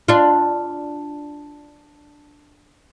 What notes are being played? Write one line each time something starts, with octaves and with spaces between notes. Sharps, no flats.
D4 F4